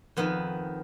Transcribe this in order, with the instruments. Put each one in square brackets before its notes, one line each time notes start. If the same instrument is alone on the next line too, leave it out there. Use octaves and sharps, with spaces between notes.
[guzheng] F2 D#3 B3